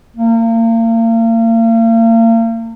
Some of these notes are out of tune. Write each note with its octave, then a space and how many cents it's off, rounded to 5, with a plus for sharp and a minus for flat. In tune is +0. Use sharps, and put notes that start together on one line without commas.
A#3 -40